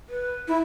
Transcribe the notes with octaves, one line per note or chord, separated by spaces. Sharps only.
B4
E4